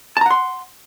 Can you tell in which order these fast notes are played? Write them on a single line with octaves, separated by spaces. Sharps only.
A5 A#5 F#5 C6